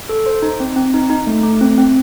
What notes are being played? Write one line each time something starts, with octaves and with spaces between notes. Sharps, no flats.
A4
C5
D#4
C4
C4
D#4
D#4
A3
A3
C4
C4